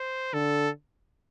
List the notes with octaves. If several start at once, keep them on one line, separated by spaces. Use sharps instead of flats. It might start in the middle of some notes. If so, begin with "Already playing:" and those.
Already playing: C5
D3 A4